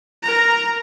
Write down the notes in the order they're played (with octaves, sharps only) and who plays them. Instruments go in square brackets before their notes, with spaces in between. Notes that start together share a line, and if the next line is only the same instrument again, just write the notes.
[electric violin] A#4 A#5